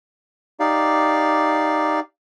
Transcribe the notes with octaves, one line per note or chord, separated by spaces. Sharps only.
D#4 G4 D5 F5